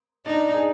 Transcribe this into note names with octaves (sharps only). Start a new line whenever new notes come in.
D4 D#4 D5
G#4